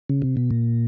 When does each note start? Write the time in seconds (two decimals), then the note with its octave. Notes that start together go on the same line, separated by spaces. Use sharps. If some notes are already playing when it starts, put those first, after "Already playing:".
0.10 C#3
0.22 C3
0.37 B2
0.51 A#2